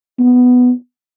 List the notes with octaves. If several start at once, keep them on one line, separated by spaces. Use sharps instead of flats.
B3